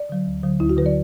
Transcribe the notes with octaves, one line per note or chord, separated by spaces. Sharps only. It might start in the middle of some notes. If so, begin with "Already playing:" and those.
Already playing: D5
D3 F#3
D2
D3 F#3
D2 E4
F#4
D3 B4
F#3 D5